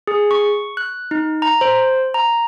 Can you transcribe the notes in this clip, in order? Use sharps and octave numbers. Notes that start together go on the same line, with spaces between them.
G#4
C#6
F#6
D#4
A#5
C5
A#5